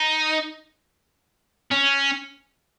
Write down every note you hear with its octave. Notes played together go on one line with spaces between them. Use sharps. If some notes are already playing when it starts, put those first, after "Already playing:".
Already playing: D#4
C#4